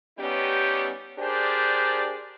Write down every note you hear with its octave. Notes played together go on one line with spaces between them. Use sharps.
G3 B3 C#4 D#4 G4
D4 G4 G#4 A#4 C5 D5